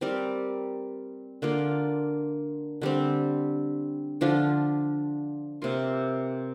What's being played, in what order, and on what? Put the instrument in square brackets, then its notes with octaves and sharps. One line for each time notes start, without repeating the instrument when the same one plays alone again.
[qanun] G3 C4 A#4 D5
D3 A#3 F4 D5
D3 G3 C4
D3 F3 D4 F4
C3 A#3 F4